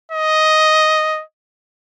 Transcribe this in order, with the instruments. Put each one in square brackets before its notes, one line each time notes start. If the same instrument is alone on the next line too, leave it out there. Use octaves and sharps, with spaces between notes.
[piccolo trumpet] D#5